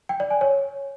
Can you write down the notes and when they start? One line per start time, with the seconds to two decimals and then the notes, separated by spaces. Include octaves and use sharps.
0.09 G5
0.20 D5
0.31 G#5
0.41 C#5